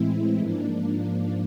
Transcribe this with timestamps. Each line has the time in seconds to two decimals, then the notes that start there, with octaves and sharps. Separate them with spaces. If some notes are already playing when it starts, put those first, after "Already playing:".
Already playing: A2 E3 G#3 C4 E4
0.37 G#2 F3 A#3 D4